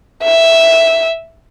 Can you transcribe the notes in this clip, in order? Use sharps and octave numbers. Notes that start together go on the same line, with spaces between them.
E5